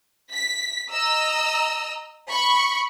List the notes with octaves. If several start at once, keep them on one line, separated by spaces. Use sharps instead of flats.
B6
D#5 A#5 E6
B5 C#6